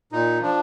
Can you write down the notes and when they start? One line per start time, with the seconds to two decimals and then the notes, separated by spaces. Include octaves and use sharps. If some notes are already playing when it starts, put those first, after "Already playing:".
0.12 A#2 D#4
0.41 F3 D4